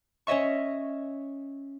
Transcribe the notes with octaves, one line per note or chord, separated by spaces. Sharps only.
C#4 C#5 D#5 E5 C#6